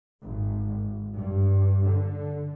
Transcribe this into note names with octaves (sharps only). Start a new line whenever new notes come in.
G#1
G2
D3